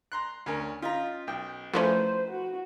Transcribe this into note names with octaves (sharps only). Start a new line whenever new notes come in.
A#5 C6 F#6
D2 C#4 A#4
C#4 F4 D#5 A#5 B6
B1 G5
F3 A3 C#4 E4 B4 C5
F#4